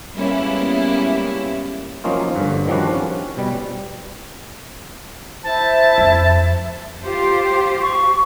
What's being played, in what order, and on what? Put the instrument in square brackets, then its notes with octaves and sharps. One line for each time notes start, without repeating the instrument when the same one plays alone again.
[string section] G3 G#3 A#3 B3 C#4 E4
[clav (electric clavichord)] F3 F#3 A#3 C#4 D#4 F4
G2 D3
D#3 F3 G3 C#4 D4 F#4
C#4
B2 G3
[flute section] E4 C5 [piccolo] A5
[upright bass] F2
[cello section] F4 G4 C5
[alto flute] C#6